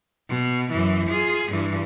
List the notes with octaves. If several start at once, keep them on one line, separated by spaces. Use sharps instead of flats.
B2
F#2 E3
F4 G#4
G2 E3